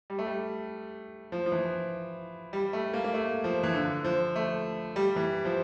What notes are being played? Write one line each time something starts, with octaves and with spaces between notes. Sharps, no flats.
G3
A3
G3
F3
F3
E3
G3
A3
A#3
A#3
A3
F3
E3
D3
F3
A3
G3
E3
F3